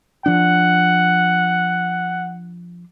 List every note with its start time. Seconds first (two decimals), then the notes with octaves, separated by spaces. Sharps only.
0.26 F3 D4 F#5